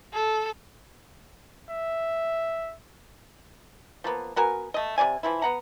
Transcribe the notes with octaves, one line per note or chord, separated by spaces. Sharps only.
A4
E5
F3 A#3 B3
B3 F#4 A#4 G#5
A3 D#5
C3 F4 D5 G#5
E3 F3 E4
B3 F#5 A#5